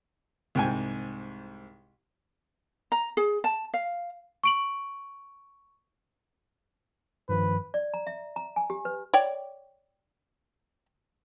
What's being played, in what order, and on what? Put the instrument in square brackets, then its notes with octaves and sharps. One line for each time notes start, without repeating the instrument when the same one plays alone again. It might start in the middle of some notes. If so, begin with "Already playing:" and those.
[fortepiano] C2 G#2 G5 G#5
[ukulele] A#5
G#4
A5
F5
[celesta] C#6 D7 F#7
[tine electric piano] G2 D#3 F3 [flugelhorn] B4
[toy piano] D5
A#5
E5
A#5
G#5
G4
B4
[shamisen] C#5 D5 G5